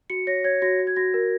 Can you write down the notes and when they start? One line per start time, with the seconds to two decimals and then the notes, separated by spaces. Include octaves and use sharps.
0.10 F#4 C#7
0.27 C#5 A#6
0.44 C#5 G#6
0.62 F#4 A#6
0.79 F#4
0.87 G#6
0.96 F#4 A#6
1.14 A#4